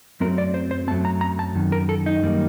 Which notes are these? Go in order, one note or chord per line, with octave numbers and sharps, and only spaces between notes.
F#2 F#3 A3 C4 A#4
D5
C5
C5
F#2 F#3 A3 C4 A5
A#5
A#5
A5
F#2 D#3
A#4
A4
D#4
F#2 D#3 G3 A#3